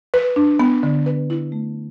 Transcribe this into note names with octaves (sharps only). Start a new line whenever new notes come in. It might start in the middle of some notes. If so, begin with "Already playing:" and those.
B4
D4
B3
D3
B4
E4
A3